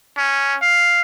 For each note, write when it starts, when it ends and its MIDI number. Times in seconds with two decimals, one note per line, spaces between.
0.17 0.56 61
0.62 1.02 77